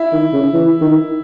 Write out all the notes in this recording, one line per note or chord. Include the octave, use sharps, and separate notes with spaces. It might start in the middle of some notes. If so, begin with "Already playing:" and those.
Already playing: E4
D#3
C#3
E3
D#3